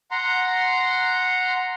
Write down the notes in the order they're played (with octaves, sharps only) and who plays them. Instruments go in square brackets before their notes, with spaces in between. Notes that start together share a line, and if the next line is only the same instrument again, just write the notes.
[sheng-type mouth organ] F#5 A#5 C6